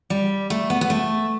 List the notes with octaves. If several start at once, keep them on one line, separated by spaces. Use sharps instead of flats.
G3
A3
B3
B3
A3